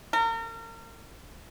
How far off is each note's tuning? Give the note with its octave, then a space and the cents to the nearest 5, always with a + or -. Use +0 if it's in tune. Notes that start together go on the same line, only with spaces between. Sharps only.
A#4 -35